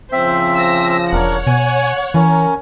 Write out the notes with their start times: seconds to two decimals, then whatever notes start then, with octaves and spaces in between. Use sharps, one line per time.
0.12 C#3 F3 C4 C5 E5
0.55 E6 A#6
1.13 E1 D4 A#4 C#5 F#5
1.47 B2 G#5
2.14 E3 C#4 A#4